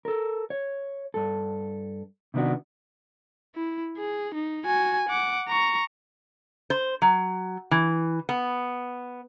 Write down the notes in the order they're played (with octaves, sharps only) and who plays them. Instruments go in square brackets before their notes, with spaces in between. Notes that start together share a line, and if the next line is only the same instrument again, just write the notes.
[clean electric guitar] A4 A#4
C#5
G2 A4
C3 D#3 B3 D4 F#4
[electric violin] E4
G#4
D#4
F#4 G#5
F#5 D6
A#5 C#6
[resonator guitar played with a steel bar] C5
F#3
E3
B3